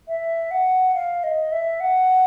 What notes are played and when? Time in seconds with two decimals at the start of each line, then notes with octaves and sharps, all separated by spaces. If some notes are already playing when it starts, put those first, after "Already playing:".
0.08 E5
0.51 F#5
0.95 F5
1.24 D#5
1.52 E5
1.80 F#5